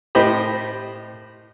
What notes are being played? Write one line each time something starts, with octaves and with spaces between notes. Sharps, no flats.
A2 G4 C5 D#5 B5